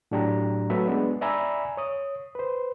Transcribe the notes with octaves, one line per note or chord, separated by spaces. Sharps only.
A2 F#3 D4 G4 A#5
F#3 A3 B4 E5
G#3 B3 D4
D5 E5 G#5 A#5 B5 E6
C#5 D#6
B4 C5